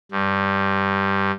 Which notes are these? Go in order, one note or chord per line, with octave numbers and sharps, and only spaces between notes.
G2